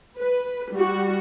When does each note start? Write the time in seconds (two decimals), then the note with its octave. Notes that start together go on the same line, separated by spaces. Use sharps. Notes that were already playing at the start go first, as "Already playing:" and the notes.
0.17 B4
0.72 G3 F#4